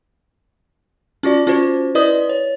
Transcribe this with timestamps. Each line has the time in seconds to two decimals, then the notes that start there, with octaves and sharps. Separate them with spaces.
1.23 C#4 F4 F#4 D5
1.47 C#4 F4 F#4 C5
1.95 E4 B4 D5 D#5 D#6
2.29 C#5